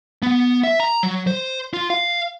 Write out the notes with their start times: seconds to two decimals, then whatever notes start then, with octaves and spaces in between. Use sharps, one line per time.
0.23 B3
0.63 E5
0.80 A#5
1.03 F#3
1.27 C5
1.74 F4
1.90 F5